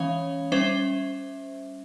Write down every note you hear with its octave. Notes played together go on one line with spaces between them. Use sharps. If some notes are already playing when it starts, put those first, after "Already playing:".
Already playing: E3 G#3 C#4 C#5 F5
G3 C#4 C5 E5